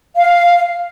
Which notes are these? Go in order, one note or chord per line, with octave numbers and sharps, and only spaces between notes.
F5